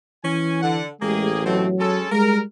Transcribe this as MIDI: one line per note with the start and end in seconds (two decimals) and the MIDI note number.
0.24 0.80 52
0.24 0.60 61
0.24 0.60 80
0.62 0.88 50
0.62 0.88 78
1.01 1.83 33
1.01 1.29 56
1.01 1.42 58
1.01 1.42 67
1.01 1.42 68
1.45 1.67 47
1.45 2.02 54
1.45 1.67 57
1.45 1.67 60
1.80 2.10 56
1.80 2.10 61
1.80 2.10 69
2.12 2.43 55
2.12 2.41 56
2.12 2.39 70